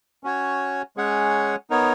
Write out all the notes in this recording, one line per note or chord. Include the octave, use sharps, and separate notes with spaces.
C#4 F#4 C#5
G#3 C#4 G#4 C#5 F#5
B3 D#4 A#4 C#5